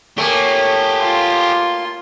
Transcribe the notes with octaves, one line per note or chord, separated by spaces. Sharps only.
A3 A#3 G4 C#5 G#5
F4 C6